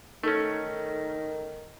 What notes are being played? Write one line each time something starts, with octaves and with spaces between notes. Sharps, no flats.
D#3 A3 C#4 D#4 A4 A#4